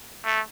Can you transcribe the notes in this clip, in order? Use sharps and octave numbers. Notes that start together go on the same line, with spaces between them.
A3